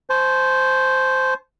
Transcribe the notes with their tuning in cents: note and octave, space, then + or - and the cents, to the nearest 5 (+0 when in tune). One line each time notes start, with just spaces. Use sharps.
C5 -5 A5 -40 C#6 -25